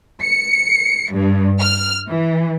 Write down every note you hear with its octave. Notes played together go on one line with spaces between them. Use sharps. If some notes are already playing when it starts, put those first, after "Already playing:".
C#7
G2
F6
E3